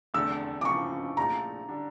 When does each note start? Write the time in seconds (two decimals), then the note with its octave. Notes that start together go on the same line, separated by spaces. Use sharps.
0.14 F1 E2 D3 A3 E6
0.61 D6
0.65 C#2 C#3 F3 C#6
1.17 A#1 A#2 A3 A#5
1.68 D3 G3 D4